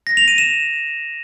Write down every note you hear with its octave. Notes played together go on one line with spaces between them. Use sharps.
A#6
F7
D#7
E7